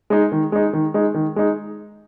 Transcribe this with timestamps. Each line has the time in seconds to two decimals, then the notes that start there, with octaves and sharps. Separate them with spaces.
0.10 G#3 D#4
0.32 D#3
0.52 G#3 D#4
0.73 D#3
0.94 G#3 D#4
1.14 D#3
1.36 G#3 D#4